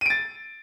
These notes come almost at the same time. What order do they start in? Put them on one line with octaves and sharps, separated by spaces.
D#7 D7 A6